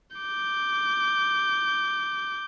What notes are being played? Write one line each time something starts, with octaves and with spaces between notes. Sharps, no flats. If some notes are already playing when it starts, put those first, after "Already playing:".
D6 G6